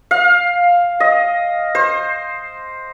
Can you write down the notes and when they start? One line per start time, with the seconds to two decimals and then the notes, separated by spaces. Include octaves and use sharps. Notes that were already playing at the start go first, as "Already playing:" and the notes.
0.11 F5
1.00 D#5
1.75 C5